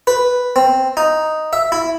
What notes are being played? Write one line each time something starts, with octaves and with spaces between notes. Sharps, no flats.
B4
C4
D#4
E5
E4